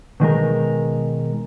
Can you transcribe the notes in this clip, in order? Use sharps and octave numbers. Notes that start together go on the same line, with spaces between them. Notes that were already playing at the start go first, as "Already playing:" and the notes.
B2 D#3 G#3 A#4